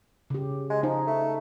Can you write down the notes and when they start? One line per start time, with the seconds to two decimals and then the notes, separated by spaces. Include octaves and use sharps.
0.30 C#3 G4
0.70 G#3
0.83 F3 D#4
1.07 A3